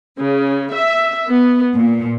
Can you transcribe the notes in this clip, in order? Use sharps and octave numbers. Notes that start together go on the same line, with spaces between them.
C#3
E5
B3
A#2